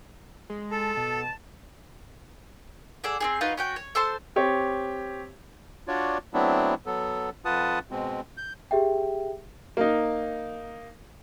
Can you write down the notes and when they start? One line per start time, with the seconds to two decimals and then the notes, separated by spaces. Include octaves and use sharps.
0.50 G#3
0.72 A4 A5
0.97 B2
3.04 G#4 A4 D5 F#5
3.20 C4 D#4 G#4
3.41 D#4 F4 F#4 B4
3.57 C#4 F#4 G5
3.76 C#5
3.95 A4 C5 A5 C6
4.36 C4 G4 C#5
5.88 D4 F4 F#4 C#5 D5
6.34 F#3 A3 B3 C4 D4 E4
6.86 F#3 B3 A4
7.45 F2 F4 B4 F#5 A5 D#6
7.91 B2 G#3 C4
8.37 G6
8.71 G4 G#4 E5 G5
9.77 A#3 D#4